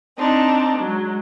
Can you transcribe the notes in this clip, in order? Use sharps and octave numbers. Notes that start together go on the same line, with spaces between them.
C4 D4 D#4
F#3 G#3